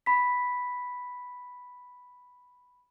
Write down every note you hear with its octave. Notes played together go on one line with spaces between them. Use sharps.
B5 B6